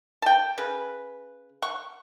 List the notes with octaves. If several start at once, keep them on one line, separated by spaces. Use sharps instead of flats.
G5 A5
C#3 B4
F#5 C#6